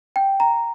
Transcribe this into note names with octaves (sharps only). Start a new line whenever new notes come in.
G5
A#5